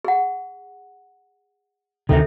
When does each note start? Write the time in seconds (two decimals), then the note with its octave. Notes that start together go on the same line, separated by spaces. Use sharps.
0.05 G#4 F#5
2.09 D2 C3 D#3 A4 E5